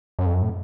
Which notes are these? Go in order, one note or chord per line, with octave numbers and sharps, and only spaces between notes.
F#2
F2
F#2
A2